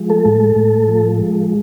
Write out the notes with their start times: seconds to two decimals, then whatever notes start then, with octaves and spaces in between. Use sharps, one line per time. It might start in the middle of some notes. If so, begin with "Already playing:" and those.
Already playing: F3 G#3
0.10 A3 A4
0.26 A2
0.56 A2
0.88 F3
1.19 G#3